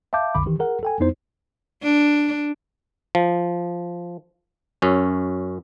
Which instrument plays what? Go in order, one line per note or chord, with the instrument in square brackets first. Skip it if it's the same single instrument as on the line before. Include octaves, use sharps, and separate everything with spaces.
[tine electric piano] E5 F5 A5 D6 G6
B1 F2 D3 B5 D6
D#3 E3 G4
G#4 A#4 F#5
A4 G5 G#5
F2 B3 D#4 E4 C5
[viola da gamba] D4
[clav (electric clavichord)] F3
F#2 C#4